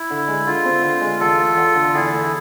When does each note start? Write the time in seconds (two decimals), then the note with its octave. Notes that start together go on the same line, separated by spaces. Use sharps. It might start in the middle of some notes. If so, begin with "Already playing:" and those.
Already playing: E4
0.10 D3
0.28 G#3
0.47 D3 F4
0.65 C4
0.83 D3
1.01 G#3
1.20 E2 F4 A4
1.38 A3
1.57 E2
1.75 D3
1.94 E2 E4 G#4
2.12 A3